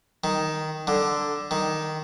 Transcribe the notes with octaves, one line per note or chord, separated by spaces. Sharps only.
D#3
D3
D#3